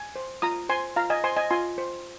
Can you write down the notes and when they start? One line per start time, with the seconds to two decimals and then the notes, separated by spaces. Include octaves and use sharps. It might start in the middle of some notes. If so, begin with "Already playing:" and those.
Already playing: G#5
0.16 C5
0.42 F4 A#5 D#6
0.69 C5 G#5 C6
0.96 F4 F5 A#5
1.10 D#5 G#5
1.24 C5 G#5 C6
1.37 D#5 G#5
1.51 F4 G#5 C6
1.78 C5